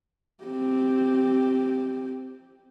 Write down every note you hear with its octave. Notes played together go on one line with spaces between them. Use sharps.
C4 G4